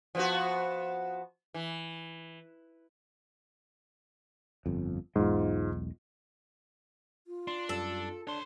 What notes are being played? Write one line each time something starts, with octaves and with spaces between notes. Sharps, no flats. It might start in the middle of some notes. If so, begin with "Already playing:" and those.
F3 B3 F#4
E3
G1 F2
B1 E2 G#2 G#3 F4
F4
D4 C6
F#2 G3 A4
D4 C#5 C6